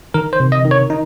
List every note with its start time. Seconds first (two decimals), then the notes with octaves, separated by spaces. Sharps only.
0.14 D#3 A#4
0.33 C5
0.40 C3
0.52 D#5
0.65 D#3
0.71 C#5
0.90 D#4